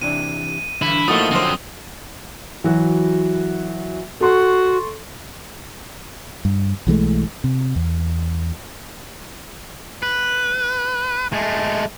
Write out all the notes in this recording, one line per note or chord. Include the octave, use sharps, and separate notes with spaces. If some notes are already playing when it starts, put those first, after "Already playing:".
C3 E3 D4 D#7
G2 D3 E3 E4
A2 F3 A3 A#3 D#4 F#4 D#6 G7
D3 F3 F#3 C4 C5
E3 F#3 F#4
F#4 A4 C6 C#6
G2
B1 E3 G#3 A3
C3
E2
B4
G#3 A3